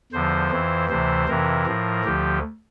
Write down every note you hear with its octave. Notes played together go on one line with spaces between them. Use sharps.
E2 D3 F3 C5
F2 E3
D2 C3 E3 C5
F2 C3 E3 A#4
A2 F3
D2 D3 F3 G4